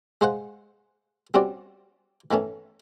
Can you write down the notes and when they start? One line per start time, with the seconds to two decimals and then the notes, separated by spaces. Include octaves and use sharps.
0.21 G#3 C5 F5 F#5
1.34 G3 C4 C#4 F#4 D5
2.31 D#3 E3 A3 C#4